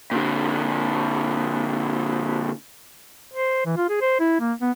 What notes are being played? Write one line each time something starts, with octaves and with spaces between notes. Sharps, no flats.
A#2 D3
C5
E3
F4
G#4
C5
E4
A#3
B3